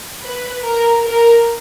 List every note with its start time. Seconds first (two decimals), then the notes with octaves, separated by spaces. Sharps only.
0.22 B4
0.64 A#4
1.04 A#4